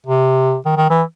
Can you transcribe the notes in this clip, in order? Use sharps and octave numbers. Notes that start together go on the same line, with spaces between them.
C3
D#3
D#3
E3